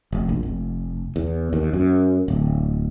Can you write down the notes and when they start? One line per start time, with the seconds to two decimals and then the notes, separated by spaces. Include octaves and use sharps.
0.12 F1
0.29 A#1
0.43 F1
1.16 E2
1.53 D#2
1.73 F#2
2.28 D1